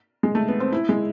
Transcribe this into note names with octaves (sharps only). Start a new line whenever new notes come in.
G#3
A3
B3
C4
E4
G#3